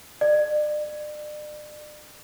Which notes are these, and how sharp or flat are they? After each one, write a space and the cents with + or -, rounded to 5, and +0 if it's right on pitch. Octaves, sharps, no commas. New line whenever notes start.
D5 +35